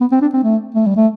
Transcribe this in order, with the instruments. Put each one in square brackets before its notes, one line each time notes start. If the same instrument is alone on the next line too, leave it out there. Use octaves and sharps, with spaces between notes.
[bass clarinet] B3
C4
D4
C4
A3
A3
G3
A3